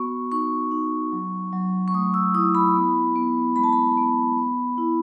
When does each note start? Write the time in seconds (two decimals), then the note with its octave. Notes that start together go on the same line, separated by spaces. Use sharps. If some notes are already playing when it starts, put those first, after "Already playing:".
Already playing: B3 F#4 C#6
0.32 D#4 C#6
0.71 D#4
1.12 F#3
1.53 F#3
1.88 C#6
1.94 A3 D#6
2.14 E6
2.34 E4 D#6
2.55 B5
2.75 B3
3.16 B3
3.56 G#3 B5
3.64 A5
3.73 B5
3.97 B3
4.38 B3
4.78 E4